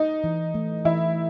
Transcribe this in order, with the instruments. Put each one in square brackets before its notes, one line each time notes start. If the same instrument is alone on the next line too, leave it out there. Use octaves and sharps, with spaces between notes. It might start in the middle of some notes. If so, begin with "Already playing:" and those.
Already playing: [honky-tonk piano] D#4
[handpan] E3
A3
[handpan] E3 [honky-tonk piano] E4